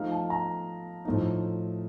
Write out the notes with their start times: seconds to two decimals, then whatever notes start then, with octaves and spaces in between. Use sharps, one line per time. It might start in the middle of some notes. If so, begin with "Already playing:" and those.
Already playing: F3 A3 D#4 F5
0.11 A5
0.30 A#5
1.05 A2 F3 A3 D#4